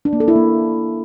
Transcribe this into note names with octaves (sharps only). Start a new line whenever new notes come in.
D4
A#3
A4
E4
A#3